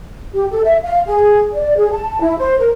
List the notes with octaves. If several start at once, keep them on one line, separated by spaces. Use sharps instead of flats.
G4
A4
E5
F5
G#4
D5
G#4
A5
E4
C5
A#4